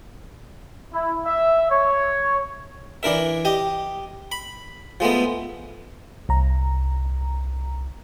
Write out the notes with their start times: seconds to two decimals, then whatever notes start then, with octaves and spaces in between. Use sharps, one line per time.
0.91 E4
1.25 E5
1.70 C#5
3.03 E3 D4 A#4 E5
3.45 G4 D#5
4.32 B5
5.00 F3 G#3 A3 B3
6.29 C2 A#5